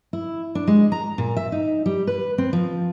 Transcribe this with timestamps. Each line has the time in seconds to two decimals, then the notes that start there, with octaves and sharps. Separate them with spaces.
0.13 E4
0.55 D4
0.67 G#3
0.92 A#5
1.18 A#2
1.36 E5
1.52 D#4
1.86 G3
2.07 B4
2.38 C4
2.53 F3